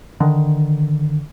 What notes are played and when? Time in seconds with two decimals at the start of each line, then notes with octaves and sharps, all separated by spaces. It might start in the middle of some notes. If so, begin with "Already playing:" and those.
0.20 D3 D#3